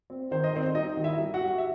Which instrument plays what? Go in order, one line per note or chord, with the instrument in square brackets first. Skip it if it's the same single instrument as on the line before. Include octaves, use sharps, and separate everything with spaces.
[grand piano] C4
D#3 C5
D#5
D#3 C4 C5
G3 D#4 D#5
D#3
E4 E5
G3
F#4 F#5
G3
E5